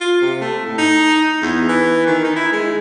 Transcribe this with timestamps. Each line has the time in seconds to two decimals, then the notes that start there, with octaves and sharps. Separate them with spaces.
0.01 F4
0.22 C3
0.41 A3
0.66 A2
0.78 D#4
1.42 E2
1.69 E3
2.06 D#3
2.24 D#4
2.36 E4
2.53 G#3